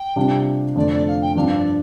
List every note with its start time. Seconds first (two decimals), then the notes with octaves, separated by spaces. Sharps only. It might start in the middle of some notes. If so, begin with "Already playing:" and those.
Already playing: G5
0.16 C3 G3 D4 F4
0.76 F2 D3 A3 D5
0.91 D5
1.06 F5
1.21 G5
1.35 G2 F3 D4 F5
1.56 D5